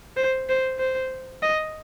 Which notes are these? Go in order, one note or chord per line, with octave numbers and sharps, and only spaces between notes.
C5
C5
C5
D#5